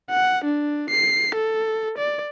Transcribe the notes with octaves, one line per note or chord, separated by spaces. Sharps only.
F#5
D4
C7
A4
D5